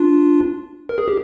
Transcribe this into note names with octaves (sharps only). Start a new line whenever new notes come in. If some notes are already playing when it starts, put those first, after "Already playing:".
Already playing: D4 F4
A#4
G#4
G4